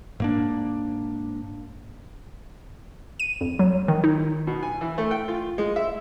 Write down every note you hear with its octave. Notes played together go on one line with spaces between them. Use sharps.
G#2 A#3 D4
D#7
F2
F#3
D#3
D#4
B2
G#5
E3
A3
G5
F4
G#3
E5